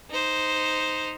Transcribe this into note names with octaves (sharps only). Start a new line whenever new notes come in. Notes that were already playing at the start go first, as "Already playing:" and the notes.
D#4 C5